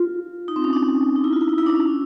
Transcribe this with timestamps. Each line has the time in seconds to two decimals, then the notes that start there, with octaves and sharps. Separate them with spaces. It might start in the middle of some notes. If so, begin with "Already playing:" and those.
Already playing: F4
0.48 D#4
0.56 C4
0.64 C#4
0.73 D4
1.16 D#4
1.24 E4
1.33 F4
1.41 E4
1.49 D#4
1.58 E4
1.66 D4
1.75 C#4